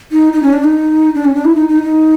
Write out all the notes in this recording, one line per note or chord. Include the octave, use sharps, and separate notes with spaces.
D#4
D#4
C#4
D4
D#4
D4
C#4
D4
E4
D#4
D#4
D#4